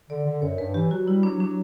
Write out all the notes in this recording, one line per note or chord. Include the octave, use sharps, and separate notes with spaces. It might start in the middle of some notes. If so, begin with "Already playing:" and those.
D3 D5
D3
F#2 C#5
G2 B4
E3 G4
F#3 F#4
G3 E4
F#3 D4
F#3 D4